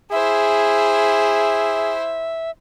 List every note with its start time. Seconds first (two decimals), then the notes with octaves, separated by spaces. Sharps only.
0.12 E4 G#4 C5 E5